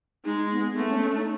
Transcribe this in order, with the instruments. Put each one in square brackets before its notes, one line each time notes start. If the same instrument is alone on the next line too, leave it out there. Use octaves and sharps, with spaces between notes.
[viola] G#3 [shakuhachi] D#4
[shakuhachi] B3
[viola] A3 [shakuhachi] B3
[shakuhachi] C#4
C#4
D#4